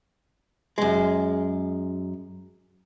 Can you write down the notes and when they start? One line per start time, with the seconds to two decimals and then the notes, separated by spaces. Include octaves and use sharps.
0.78 F#2 G#3